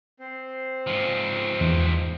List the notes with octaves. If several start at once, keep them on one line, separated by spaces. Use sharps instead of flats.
C4 C5
G#2 F3
E2